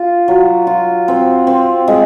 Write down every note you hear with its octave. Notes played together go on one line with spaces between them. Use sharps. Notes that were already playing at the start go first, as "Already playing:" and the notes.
Already playing: F4
F#3
F4
C4
C4
G#3